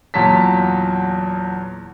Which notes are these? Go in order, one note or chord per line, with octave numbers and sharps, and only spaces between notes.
E2 A#2 F#3 A5 B6